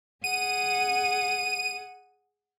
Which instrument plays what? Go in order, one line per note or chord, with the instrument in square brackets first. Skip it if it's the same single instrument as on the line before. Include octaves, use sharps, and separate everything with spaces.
[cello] G#4 F#5 [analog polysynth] D#7